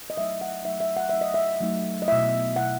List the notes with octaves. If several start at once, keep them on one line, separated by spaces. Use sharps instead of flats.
D#5
F#3 A3 D#4 E5
F#5
F#3 A3 D#4 E5
E5
F#5
F#3 A3 D#4 E5
D#5
E5
F#3 A3 D#4
D#5
B2 A3 E4 E5
B2 A3 E4 F#5